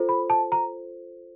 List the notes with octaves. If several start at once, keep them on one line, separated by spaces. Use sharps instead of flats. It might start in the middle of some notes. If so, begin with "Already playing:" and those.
Already playing: F4 A4 C5
B5
A5
A#5